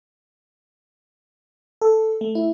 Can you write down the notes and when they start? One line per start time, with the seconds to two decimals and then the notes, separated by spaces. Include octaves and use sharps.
1.81 A4
2.21 A3
2.35 E4